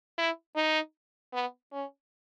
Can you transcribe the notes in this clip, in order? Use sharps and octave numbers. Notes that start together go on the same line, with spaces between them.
E4
D#4
B3
C#4